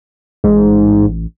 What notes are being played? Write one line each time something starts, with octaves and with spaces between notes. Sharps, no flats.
A1 G#2